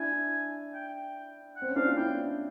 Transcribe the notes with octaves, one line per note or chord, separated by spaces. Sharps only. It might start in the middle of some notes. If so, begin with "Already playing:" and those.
Already playing: D4 E4 G#5
G5
F#5
C4
C#4
C4 D4 F5
F4
D4 E4 G5